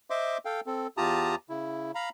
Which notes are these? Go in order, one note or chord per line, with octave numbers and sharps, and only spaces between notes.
C5 D#5 E5 C6 D6
A4 F5 G5
C4 A4
E2 F4 G4 A5 A#5 D#6
C#3 E4
F5 A#5 B5